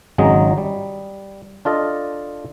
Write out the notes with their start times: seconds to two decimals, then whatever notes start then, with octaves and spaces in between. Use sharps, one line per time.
0.18 G#1 C#3 F#3 G#3 D#4 D#5
0.58 G3
1.65 D4 F4 A4 D#5